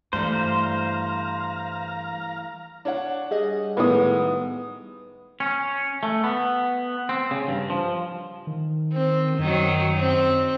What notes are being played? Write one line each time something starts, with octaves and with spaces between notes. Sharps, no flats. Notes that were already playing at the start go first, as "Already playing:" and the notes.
G2 E3 G3 A3 C5 F5 A#5
D4 C#5 F#5
G3 G#4 D#5
A2 D#3 G#3 B3 D#6
C#4
A3
B3
C4
C#3
G2
F3
D#3
C4
F#2 D#3 F#3
C4